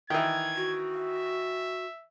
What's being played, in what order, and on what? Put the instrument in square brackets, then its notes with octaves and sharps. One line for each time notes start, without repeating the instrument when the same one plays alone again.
[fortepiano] D#3 E3 [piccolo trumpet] G#6
[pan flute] F#4
[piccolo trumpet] E5